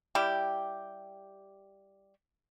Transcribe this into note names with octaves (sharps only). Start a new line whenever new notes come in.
G3 E4 G4